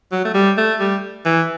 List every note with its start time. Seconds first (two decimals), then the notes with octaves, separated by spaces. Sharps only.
0.12 F#3
0.25 A3
0.34 G3
0.57 A3
0.80 G3
1.26 E3